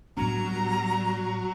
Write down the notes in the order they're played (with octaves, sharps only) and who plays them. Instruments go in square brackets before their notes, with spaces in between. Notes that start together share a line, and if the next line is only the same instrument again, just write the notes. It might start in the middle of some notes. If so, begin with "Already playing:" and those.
[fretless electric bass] A2 B3 D4 [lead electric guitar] F#3 [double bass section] G3 [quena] A#5